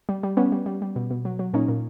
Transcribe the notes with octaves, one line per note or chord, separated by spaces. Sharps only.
G3
G3
G3 B3 C#4
G3
G3
G3
B2
B2
F#3
F#3
A#2 C#4 D#4
A#2